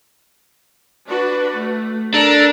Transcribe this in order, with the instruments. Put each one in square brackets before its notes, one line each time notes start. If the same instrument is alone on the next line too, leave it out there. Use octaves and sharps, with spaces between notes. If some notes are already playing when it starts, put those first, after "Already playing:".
[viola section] D4 F#4 B4
A3
[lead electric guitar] D4 [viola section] A4 A#4 A#5